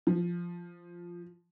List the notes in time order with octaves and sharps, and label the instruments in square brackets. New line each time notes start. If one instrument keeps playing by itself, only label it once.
[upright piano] F3